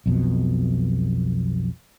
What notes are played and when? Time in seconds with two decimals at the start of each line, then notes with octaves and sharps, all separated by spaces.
0.06 B1 F2 B2